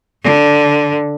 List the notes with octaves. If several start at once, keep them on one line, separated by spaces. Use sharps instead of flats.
D3